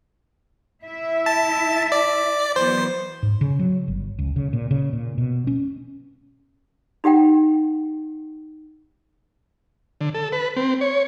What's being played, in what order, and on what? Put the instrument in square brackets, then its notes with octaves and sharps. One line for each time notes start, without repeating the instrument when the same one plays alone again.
[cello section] E4 E5
[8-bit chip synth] A5
D5
[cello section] E3 F#3 B3 [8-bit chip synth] C5
[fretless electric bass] G#2
C#3
F#3
G1
C#2
C#3
A#2
C#3
A#2
B2
C#4
[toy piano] D#4 G4 F#5 G5
[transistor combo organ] D3
A4
B4
C4
C#5